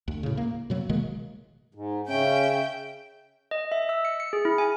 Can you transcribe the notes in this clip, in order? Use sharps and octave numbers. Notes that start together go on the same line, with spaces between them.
D2
A2 C#3
A#3
B2 F#3 A3 A#3
B2 D#3 G#3 A#3
G#2
C#3 C#4 E5 G5
D#5
E5
E6
C#7
C#7
G#4
E4
G#5